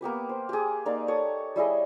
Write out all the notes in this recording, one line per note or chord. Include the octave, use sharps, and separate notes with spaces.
A#3 B3 G4 B4
C5
G4 G#4
A#3 D#4 D5
A4 C#5 D#6
G3 E4 G#4 D#5